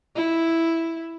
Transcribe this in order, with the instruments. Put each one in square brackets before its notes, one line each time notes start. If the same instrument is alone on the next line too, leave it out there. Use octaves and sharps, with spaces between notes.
[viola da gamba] E4